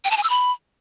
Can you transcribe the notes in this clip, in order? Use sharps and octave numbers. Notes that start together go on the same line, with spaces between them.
G5
A5
G#5
E6
B5